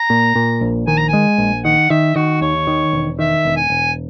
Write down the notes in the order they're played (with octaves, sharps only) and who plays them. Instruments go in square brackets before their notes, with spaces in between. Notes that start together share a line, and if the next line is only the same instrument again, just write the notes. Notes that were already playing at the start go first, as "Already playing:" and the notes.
Already playing: [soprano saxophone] A#5
[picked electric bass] A#2
A#2
A#1
[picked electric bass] D#3 [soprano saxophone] G#5
[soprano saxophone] A#5
[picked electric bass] G#3 [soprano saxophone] G#5
[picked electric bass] A#1
[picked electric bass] D#3 [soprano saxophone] F#5
[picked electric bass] D#3 [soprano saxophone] E5
[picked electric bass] D#3 [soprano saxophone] F#4
[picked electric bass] D#2 [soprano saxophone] C#5
[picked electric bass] D#3
E1
[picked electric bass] D#3 [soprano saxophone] E5
[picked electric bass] E1
[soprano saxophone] G#5
[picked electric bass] E1